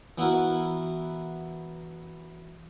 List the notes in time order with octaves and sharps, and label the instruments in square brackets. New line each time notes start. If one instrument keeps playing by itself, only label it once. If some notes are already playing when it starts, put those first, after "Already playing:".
[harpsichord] E3 B3 E4 F#4 A#4